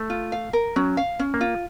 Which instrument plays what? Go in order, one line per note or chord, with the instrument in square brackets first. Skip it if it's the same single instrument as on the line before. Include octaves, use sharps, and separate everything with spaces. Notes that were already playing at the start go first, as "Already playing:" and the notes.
Already playing: [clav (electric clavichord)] A3
[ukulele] F4
F5
A#4
[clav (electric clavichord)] F#3 [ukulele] C#4
[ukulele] F5
C#4
[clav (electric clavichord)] A#3
[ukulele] F4